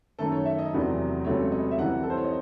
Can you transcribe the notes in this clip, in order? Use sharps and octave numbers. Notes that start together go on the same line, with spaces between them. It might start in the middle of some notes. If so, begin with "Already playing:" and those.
F#2 D#3 A3 A4
C#5
E5
D#5
E2 C3 F#3 A3
C#2 C3 F#3 A3 C#5
D#5
E5
C2 C3 E3 F#5
A4
C5
C#5
D#5